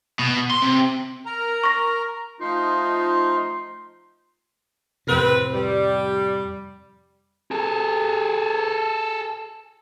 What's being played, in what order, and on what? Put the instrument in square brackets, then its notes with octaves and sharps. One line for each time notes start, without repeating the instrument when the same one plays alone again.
[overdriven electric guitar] B2
C6
C3
[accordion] A#4 A#5
[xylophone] C#6 A#6
[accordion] F3 D#4 [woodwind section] A3 F4 C6
[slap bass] F2 A2 C3 [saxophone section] C4 B4
[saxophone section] G3
[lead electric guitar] G#4 A4